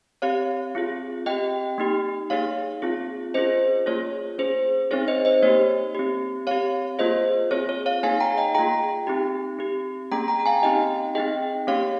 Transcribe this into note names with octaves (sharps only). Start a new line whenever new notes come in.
C4 G4 C#5 F5
C4 F4 G#4
C4 G4 D#5 G5
A#3 D#4 G4
A#3 D#4 G#4 C#5 F5
C4 F4 G#4
C#4 F4 G#4 C5 D#5
A#3 F4 G#4 C#5
C#4 G#4 C5
C4 D#4 G#4 C#5
C5 D#5
C5 D#5
A#3 D#4 G4 C#5
C4 G4
C4 G4 C#5 F5
A#3 F4 G#4 C5 D#5
C4 F4 G#4 C#5
C#5
C#5 F5
A#3 D#4 G#4 F5 G#5
G5 A#5
D#5 G5
A#3 F4 G#4 G5 A#5
C4 D#4 G4
C4 G4
A#3 C#4 G#4 G5 A#5
G5 A#5
A#5
F5 G#5
C4 D#4 G4 D#5 G5
C4 D#4 G#4 D#5 G5
A#3 C#4 G4 C#5 F5